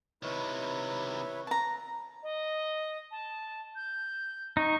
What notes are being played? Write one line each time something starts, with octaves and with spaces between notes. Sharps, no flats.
C3 D#3 E4 B4 C#5
A5 A#5
D#5
A5
G6
D#4 C#6